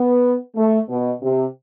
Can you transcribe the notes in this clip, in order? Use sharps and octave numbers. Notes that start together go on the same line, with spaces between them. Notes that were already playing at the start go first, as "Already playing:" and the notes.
Already playing: B3
A3
B2
C3